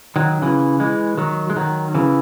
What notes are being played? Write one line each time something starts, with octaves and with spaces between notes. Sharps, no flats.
D#3 F#3
C#3 E3
E3 G#3
D#3 F#3
G#3
D#3 F#3
C#3 E3